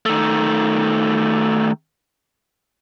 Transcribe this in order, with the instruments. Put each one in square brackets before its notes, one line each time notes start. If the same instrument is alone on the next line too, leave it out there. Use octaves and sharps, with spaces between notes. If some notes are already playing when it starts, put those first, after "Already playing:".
[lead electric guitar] D#3 A3